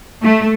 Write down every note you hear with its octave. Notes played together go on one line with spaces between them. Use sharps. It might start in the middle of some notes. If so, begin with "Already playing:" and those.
A3